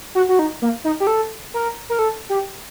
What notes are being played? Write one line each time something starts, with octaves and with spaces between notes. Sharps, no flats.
F#4
F#4
D#4
A#3
D#4
G4
A4
A#4
A#4
A4
G4